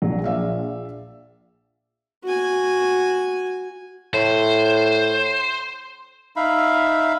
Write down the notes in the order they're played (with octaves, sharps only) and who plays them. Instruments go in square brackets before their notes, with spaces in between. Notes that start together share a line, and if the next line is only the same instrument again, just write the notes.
[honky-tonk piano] A#1 [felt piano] F#3
[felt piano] D5 E5 F5
[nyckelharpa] F#4 G#5
[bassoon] A2 [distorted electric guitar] C5
[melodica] D#4 E5 F5 B5